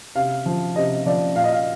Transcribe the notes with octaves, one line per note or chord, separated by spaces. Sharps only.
C3 F5
F3
C3 D#5
F3 D5
A#2 F5
D#5
F5